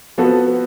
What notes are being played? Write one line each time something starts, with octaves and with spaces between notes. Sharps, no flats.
F3 B3 F#4 A4